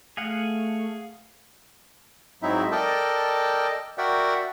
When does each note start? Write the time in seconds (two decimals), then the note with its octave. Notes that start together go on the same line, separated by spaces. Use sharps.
0.17 A3 G#4 F5 F#5
2.42 G#2 F#3 C4 D#4 E4 E5
2.71 A4 A#4 D5 D#5 G5 A5
3.98 F#4 A#4 D5 E5 F#5 G5